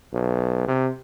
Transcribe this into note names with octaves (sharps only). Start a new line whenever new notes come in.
B1
C3